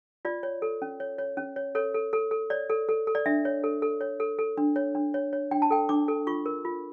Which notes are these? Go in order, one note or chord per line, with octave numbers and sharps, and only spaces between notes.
F4 D5
C#5
A4
C#4
C#5
C#5
C#4
C#5
A4 C#5
A4
A4
A4
C#5 D5
A4
A4
A4
D5
D4 E5
C#5
A4
A4
C#5
A4
A4
D4
C#5
D4
C#5
C#5
D4 G5
A5
A4 G5
D4 D6
A4
F4 C#6
A#4
F4